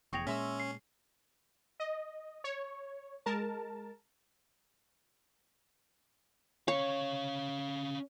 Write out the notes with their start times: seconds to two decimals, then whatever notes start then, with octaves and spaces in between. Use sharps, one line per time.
0.13 F1 E2 G#4 C#5 G5 C#6 A#6 F7
0.27 A#2 G#3 C#4 E5 C6 E6
0.60 C7
1.80 D#5
2.44 C#5
3.26 G#3 A#4 A5
6.68 C#4 C#5 F5